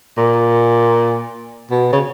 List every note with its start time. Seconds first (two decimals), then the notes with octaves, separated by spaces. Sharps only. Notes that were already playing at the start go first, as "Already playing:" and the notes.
0.17 A#2
1.70 B2
1.92 C#3